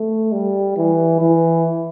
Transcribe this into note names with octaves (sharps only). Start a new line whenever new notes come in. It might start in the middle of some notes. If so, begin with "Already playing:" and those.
Already playing: A3
G3
E3
E3